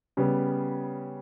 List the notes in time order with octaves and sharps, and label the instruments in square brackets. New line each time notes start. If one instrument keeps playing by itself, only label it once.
[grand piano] C#3 G3 B3